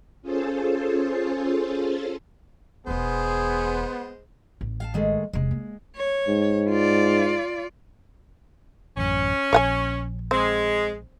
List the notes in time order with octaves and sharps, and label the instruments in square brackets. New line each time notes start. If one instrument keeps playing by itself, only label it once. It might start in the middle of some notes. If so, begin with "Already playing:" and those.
[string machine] C#4 F4 G#4 A4 C5 A5
[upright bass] E1 E2 [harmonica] G#3 C5 [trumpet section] B3 [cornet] G#4
[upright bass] A1
[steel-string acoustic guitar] F5 F#5 A5
D#3 G#3 A3
[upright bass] E1 C3 [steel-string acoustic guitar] G#3
[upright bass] A#3
[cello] C#5
[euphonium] G#2
[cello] F4 D5
[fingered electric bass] A1 F#2 [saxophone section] C#4
[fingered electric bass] A#1 [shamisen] C#5 F#5 G#5
[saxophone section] G#3 [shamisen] C4